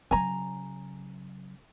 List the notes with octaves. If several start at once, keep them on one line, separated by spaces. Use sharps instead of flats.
C#3 F#3 G#5 A#5